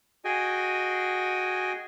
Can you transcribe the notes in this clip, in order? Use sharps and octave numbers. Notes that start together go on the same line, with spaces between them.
F#4 G#4 D#5 G5 G#5